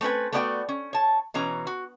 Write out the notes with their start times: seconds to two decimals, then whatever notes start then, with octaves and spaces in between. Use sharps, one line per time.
0.01 A3 C4 C#4 B4 G#5
0.32 A3 B3 F#4 D5 F5 G5
0.69 C#4
0.93 C#5 A5
1.34 B2 E3 C#4 A#5
1.67 F#4